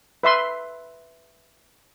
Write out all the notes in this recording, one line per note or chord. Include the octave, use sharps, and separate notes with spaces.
B4 E5 C6